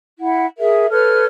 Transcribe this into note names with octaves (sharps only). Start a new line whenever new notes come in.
E4 F#5
G#4 A#4 E5
A4 B4 C#5 F6